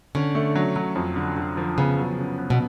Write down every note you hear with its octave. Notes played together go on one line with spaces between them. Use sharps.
D3 C#4
A3
F#3
F#3
F2
D3
D3
F3
C#3 B3
F#3
C#3
B3
B2